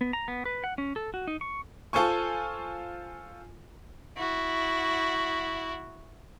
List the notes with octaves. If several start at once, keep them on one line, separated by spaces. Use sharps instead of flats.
B3
A#5
B3
B4
F#5
C#4
A4
F#4
D#4
C#6
F4 A4 C5 G#5 C#6
E4 F#4